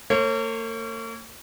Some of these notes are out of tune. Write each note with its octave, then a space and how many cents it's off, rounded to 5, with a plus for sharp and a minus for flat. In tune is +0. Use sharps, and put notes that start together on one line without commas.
A#3 -45 C#5 -30